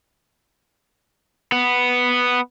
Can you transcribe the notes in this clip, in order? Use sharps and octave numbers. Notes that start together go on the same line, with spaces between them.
B3